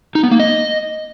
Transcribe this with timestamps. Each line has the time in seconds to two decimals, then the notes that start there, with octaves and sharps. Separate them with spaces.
0.15 D#4
0.23 B3
0.31 A#3
0.40 D#5